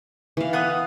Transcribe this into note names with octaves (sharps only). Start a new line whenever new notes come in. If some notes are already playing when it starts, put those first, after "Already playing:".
E3 F5
B3 F#5 D#6